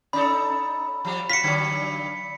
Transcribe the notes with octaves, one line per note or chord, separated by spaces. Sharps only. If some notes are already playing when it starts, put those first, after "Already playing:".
C#4 D#4 A4 B5
F3 G3
F4 F#4 B6 C#7
G2 D3 F#3